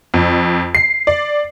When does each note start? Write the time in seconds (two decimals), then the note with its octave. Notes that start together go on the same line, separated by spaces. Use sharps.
0.14 F2
0.75 C7
1.07 D5